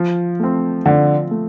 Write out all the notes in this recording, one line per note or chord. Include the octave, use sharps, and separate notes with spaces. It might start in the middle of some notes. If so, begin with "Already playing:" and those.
Already playing: F3
A3 C4
D3 F3
A3